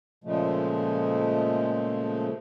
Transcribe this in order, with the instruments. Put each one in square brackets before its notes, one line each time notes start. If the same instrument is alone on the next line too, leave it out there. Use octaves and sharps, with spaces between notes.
[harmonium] A#2 C#3 F3 G#3 A3